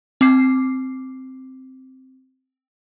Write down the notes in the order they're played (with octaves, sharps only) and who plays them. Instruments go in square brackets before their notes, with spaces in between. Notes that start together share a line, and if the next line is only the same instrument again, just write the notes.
[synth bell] C4 D6 C7